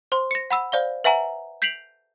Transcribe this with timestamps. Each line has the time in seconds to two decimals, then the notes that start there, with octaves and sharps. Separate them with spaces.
0.12 C5 C6
0.31 A#6 C#7
0.50 F#5 B5 E6
0.72 C5 D5 F5 G7
1.04 B4 E5 F#5 G#5 A#5
1.62 G6 B6 C7 D7 F7 F#7